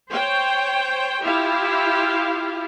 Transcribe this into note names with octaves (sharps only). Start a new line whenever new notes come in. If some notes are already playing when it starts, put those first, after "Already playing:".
C5 C#5 G5
E4 F4 G4 F5